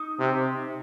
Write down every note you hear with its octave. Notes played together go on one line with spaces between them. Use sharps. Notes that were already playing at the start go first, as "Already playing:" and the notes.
Already playing: D#4
C3